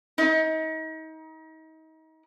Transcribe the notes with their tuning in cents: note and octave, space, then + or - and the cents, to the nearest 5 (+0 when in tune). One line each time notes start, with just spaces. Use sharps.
D#4 +35